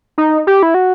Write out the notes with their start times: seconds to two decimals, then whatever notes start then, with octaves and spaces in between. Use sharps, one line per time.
0.18 D#4
0.47 G4
0.63 E4
0.74 F#4